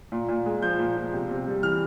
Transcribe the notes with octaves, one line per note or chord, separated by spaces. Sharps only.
A#2
A#2
G#3
F3 G6
A#2
A#2
C3
C3
G3
E3 F6